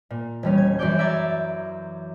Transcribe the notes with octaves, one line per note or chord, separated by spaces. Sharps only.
A#2
E1 G3 C#4
G#6
F#2 E3 D5 C#6 D6 G6
D5 E5 A#5 D6 G#6 A6